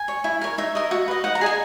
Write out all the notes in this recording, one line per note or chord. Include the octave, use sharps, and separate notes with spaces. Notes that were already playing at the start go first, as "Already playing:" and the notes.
Already playing: G#5
C#5
E4
A#4 C#5
D#4 E5
A#4 D#5
F#4
B4 D#5
D#4 F#5
A#5
G#4 D#5 G#5